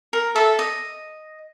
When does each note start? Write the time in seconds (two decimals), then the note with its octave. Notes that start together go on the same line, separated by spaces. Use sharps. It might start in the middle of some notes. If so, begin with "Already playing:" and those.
0.13 A#4
0.35 A4 E5
0.59 D#5